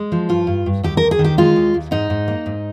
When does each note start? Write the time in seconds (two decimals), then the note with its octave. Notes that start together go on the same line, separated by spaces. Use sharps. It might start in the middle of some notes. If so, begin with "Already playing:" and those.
Already playing: G#3
0.12 F3
0.29 G2 F4
0.47 G2
0.66 G2
0.83 D#2 G4
0.97 D#2 A#4
1.11 G#4
1.19 D#3
1.24 G4
1.38 G#3 F4
1.56 D#2
1.74 D#2
1.91 G#2 D#4
2.10 G#2
2.28 A#3
2.46 G#2